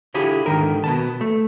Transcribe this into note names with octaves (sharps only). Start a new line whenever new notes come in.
D3 E4 F4 G4 G#4
G#2 D3 D#3 A#4
B2 B3 A5
A3